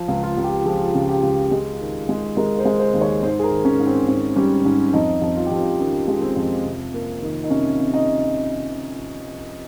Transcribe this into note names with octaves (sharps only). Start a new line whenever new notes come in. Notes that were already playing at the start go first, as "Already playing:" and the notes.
Already playing: F3
C#2
F4
C#2
G4
F3 G#4
C#3
G4
C#2
G#3
D#3
G#3
G#3 A#4
C5
G#3
C5
D#2
C#5
G#2 C5
G#4
A#4
D#3
C#4
G#2
C4
G#2 C#4
G3 C#4
G#2 C#4
F2 D#4
F2
F4
F2 G4
F4
D#3 C#4
G#3
C4
F2
C3
A#3
D#3
D#4
C3 C#4
C3
D#4